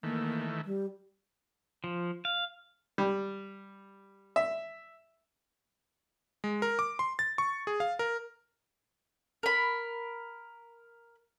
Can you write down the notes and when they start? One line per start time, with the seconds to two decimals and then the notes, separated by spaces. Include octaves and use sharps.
0.03 D#3 E3 A3 A#3
0.65 G3
1.84 F3
2.25 F5
2.98 G3
4.36 E5
6.44 G#3
6.62 A#4
6.79 D6
6.99 C6
7.19 A6
7.38 C#6
7.67 G#4
7.80 F5
7.99 A#4
9.43 A#4 B5